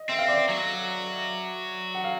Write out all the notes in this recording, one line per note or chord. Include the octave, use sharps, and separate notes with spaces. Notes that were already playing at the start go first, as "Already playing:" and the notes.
Already playing: D#5
C4 E5
F5
D5 E5
F#3
F#5
F5